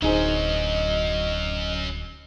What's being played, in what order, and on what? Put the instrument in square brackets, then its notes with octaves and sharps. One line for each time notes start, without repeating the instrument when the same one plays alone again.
[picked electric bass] D1 [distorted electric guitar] F#3 C#4 [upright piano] D#4 G#4 C5 [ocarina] D#5